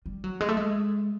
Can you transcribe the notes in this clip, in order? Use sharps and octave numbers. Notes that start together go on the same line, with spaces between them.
G3
F#3
G#3
A3
G#3